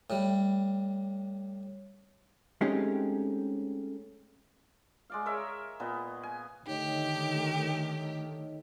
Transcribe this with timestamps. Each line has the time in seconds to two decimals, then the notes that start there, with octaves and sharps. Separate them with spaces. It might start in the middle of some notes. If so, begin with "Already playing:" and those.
0.10 A2 G3
2.61 G#3 A3 C4 C#4 D#4 G4
5.10 G#3 D5 F5
5.26 A#4 C#5 D#5 E5
5.80 A#2 B3 D#5
6.23 G#5
6.67 D3 D#3 A3 D#4 G4 C#5 D#5